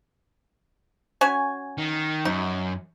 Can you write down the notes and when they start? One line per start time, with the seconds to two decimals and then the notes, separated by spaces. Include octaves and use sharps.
1.21 C#4 F#4 G#5
1.78 D#3
2.25 F#2 D#4